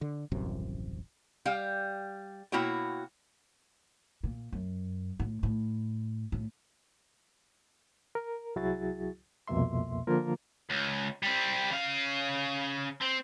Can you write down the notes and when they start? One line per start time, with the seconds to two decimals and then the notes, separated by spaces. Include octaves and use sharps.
0.01 D3
0.32 D#1 A1 F#2 C3
1.45 G3 F5 G5
2.52 B2 A#3 E4 F#4 C#5 G5
4.23 A#2
4.52 F#2
5.20 A2
5.43 A2
6.32 A2
8.15 A#4
8.56 C2 F#3 E4 F#4 G#4 A6
9.48 C2 F2 B2 A#3 E5 C6
10.07 D3 F3 A#3 F4 A#4
10.70 C#2
11.23 G3 C4
11.71 C#3 F5
13.02 C4